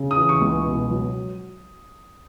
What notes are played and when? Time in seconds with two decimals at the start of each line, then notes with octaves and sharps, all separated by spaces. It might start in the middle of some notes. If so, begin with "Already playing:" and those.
Already playing: C#3
0.11 D#6
0.17 E3
0.29 C#6
0.41 C#2
0.66 B2
0.91 F#3